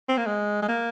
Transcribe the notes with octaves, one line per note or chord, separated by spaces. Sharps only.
C4
A#3
G#3
G#3
A#3